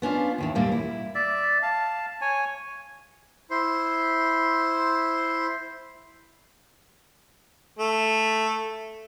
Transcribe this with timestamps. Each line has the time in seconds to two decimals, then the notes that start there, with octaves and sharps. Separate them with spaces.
0.02 B3 C#4 D4 F4
0.38 D#2 D#3 E3
0.55 D#2 A#2 G3 A#3 G4
0.72 E4
1.15 D5 E5
1.62 F5 A5
2.21 C#5 G#5
3.51 E4 C5 C6
7.79 A3